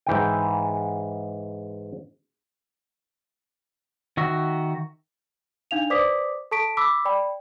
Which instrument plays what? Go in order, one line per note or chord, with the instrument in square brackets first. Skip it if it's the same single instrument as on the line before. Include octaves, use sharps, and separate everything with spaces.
[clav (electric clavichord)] G#2 E3 G5
[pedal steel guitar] D#3 F#4 E5
[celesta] D4 D#4 F5 F7
B4 C5 D5 D6 D#6 B6
A4 A5 C#6 B6 D7
B5 D6 E6 B6
D5 G5 B5